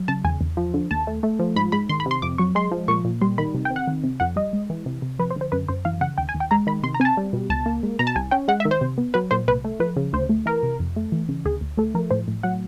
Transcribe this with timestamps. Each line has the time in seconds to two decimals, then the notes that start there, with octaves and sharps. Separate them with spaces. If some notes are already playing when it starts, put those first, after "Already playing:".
Already playing: F#3
0.08 C#3 A5
0.24 E2 G#5
0.41 E2
0.57 F3
0.74 D3
0.91 D#2 A5
1.07 A3
1.23 A3
1.39 F3
1.56 G#2 B5
1.72 G#2 B5
1.89 D#3 C6
2.00 B5
2.06 C3 C6
2.22 F2 D6
2.38 F#3 C#6
2.55 G#3 C6
2.71 F3
2.88 A#2 C#6
3.05 A#2
3.21 G3 C6
3.38 D#3 B5
3.55 C3
3.65 G5
3.71 C4
3.76 F#5
3.87 D#3
4.04 C3
4.20 F2 F#5
4.36 G3 D#5
4.53 G#3
4.70 E3
4.86 C3
5.02 C3
5.19 F3 B4
5.31 C5
5.36 D3
5.41 C5
5.52 F#2 B4
5.68 F#2 C5
5.85 E3 F5
6.01 C#3 F#5
6.18 D#2 G5
6.29 G#5
6.34 D#2
6.40 G5
6.51 G#3 A#5
6.67 D#3 B5
6.83 C3 C6
6.94 A#5
7.00 C4 G#5
7.05 A5
7.17 G3
7.33 B2
7.49 C#2 A5
7.66 A#3
7.83 G#3
7.99 B2 A#5
8.07 A5
8.16 C2 G#5
8.31 C#4 G5
8.48 G#3 F#5
8.60 E5
8.65 D#3
8.71 C5
8.81 C3
8.98 B3
9.14 F#3 B4
9.31 A#2 C5
9.48 C2 B4
9.64 A3
9.80 F3 B4
9.96 C#3
10.13 D2 C5
10.29 A3
10.46 E3 A#4
10.63 C3
10.80 F2
10.96 A3
11.12 E3
11.29 C#3
11.45 D2 G#4
11.61 D2
11.77 A3 A4
11.95 F3 A#4
12.10 A2 C5
12.28 A2
12.43 F#3 F#5